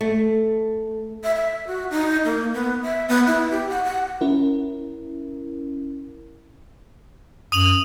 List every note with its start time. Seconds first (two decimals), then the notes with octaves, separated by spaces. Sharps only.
0.01 A3
1.24 E5
1.36 E5
1.67 F#4
1.91 D#4
2.25 A#3
2.54 B3
2.83 E5
3.09 B3
3.27 E4
3.51 G4
3.69 F#5
3.84 F#5
4.21 C#4 E4 A#4
7.52 F#2 D#6 F7 F#7